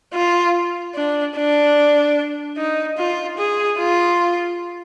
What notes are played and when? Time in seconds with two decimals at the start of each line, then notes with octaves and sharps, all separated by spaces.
0.14 F4
0.95 D4
1.36 D4
2.58 D#4
2.98 F4
3.38 G#4
3.79 F4